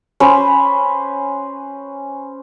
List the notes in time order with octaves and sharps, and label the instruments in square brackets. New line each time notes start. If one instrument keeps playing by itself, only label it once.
[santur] C#4 B4 C5